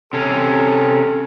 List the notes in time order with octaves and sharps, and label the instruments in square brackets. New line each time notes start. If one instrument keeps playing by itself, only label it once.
[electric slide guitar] C3 C#4 [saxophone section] A4